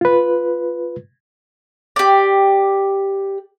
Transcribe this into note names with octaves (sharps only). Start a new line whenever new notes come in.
F4 B4
G4 D5